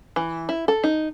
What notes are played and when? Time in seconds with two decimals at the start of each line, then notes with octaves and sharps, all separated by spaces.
0.16 E3
0.49 E4
0.68 A4
0.84 D#4